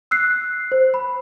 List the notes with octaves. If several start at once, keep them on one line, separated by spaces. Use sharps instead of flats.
E6 F#6 C7
C5
B5